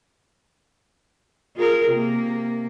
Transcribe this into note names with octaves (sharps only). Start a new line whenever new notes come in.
F4 G#4 A#4
C3 A#3